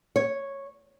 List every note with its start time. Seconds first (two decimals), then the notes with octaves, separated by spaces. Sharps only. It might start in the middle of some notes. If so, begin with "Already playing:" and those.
0.16 C#5